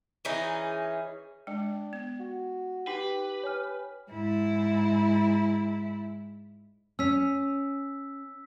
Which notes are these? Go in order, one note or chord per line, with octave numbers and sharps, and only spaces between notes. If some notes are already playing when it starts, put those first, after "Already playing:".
E3 C#4 D#4 G#4
G#3 D4 G5
B3
F#4
D#4 G4 B4 G5
C#5 G#5 F6
G#2 E4
C#4 E6 B6